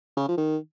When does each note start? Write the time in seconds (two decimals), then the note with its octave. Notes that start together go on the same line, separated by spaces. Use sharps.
0.17 C#3
0.28 F3
0.38 D#3